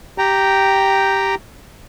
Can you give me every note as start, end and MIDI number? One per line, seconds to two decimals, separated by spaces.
0.18 1.35 67
0.18 1.35 79
0.18 1.35 82